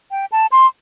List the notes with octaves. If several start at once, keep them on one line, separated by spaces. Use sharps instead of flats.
G5
A5
C6